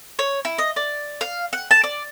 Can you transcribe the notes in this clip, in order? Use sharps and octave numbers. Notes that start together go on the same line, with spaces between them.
C#5
E4
D#5
D5
F5
F#5
A5
D5